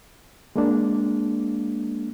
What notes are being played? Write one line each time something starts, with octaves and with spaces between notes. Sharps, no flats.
G#3 A#3 D4